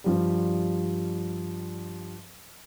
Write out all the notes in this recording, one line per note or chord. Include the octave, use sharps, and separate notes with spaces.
G2 F3 G3